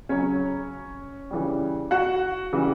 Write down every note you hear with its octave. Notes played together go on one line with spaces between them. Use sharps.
C#3 F#3 C#4 C#5
C#3 E3 G3
F#4 F#5
C#3 E3 G3